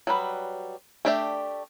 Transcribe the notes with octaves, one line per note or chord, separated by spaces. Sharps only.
F#3 G3 B4
A3 D4 G4 D5 E5